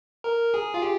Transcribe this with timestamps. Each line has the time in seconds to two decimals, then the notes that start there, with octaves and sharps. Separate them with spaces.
0.24 A#4
0.54 G#4
0.74 F4
0.82 G4